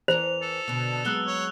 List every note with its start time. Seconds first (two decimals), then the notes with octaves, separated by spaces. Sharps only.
0.08 E2 E3 A#4 C5 F7
0.42 A4
0.68 B2 D3
1.05 F#3 G#3 B3 E6 F#6 G7
1.27 C#5